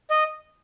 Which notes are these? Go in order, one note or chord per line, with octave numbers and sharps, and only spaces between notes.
D#5